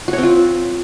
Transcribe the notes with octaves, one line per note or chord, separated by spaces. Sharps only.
F#4
C#5
C4
F4